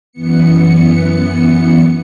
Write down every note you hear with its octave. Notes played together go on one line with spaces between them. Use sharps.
F#2 E3 B3 C#7